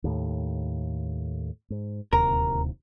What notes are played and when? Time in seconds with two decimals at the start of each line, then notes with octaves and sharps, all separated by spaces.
0.04 D#2 A2
1.70 G#2
2.13 D1 D#2 C3 A#4